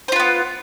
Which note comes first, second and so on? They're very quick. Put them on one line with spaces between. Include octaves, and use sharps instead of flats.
C5 F4 B4 B3